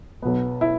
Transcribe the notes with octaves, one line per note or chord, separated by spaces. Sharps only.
B1 B2 B3
E4